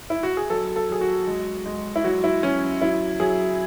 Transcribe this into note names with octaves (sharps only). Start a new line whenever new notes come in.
E4
F#4
G#4
F#3 A4
A4
F#3 G#4
F#4
G#3
G#3
E4
F#3 F#4
E4
F#3 C#4
F#3 E4
F#3 G#4